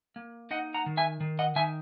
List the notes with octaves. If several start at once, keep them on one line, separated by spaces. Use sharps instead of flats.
A#3
D#4 D#5 F#5
F#5 A#5
D#3
E5 G#5
D#3
D#5 F#5
D#3 E5 G#5